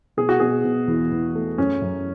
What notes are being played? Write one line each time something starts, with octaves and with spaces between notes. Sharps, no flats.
B2 G#4
F#4
B2 G#4
B2
E2
E2
A3
F#2 C#4
F#2